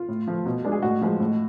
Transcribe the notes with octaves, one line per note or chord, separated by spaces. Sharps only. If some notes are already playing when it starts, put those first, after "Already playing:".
Already playing: F4
A2
F3 A3
B2
G#3 D4
G#4
A2 F#4
F3 G#3
A2